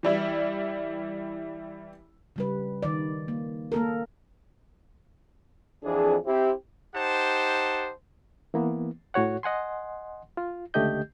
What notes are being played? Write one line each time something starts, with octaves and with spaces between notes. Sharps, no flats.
E3 G3 E4
C#3 G3 B4
D#3 D5
A#3
A#3 A4 A#4
F2 E3 D4 G#4
C4 E4 G4
D#4 G4 C5 F#5 A5
E3 A#3 B3
A2 F#4 C#5 F#5
D#5 F#5 G#5 C6
F4
C#2 D3 A3 G4 D#5 G6